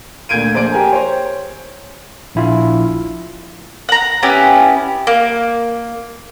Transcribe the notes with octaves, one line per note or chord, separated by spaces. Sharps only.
D2 A#2 G6 G#6 D7 D#7
A#1 C5 D5 D7
G4 A#4 G#5
C5 C#5
A#1 E4 F4
F#5 A#5
B3 C#4 E4 G4
A#3